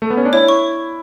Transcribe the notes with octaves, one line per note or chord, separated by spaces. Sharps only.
A3
B3
C#4
D4
E4 C#5
C#6